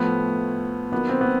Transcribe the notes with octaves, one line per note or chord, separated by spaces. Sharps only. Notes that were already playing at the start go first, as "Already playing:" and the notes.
Already playing: A2 F3 A3 B3
D#3 F#3 A#3 B3
C4
B3